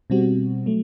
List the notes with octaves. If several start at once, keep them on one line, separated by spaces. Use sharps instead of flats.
B2 G3 C4 F#4
F#3 A3